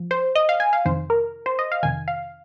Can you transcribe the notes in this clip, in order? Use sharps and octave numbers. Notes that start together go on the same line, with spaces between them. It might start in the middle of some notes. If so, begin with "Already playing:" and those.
Already playing: F3
C5
D#5
F5
G#5
F5
F2 C3 D#3 C5
A#4
C5
D#5
F5
F2 C3 D#3 G#5
F5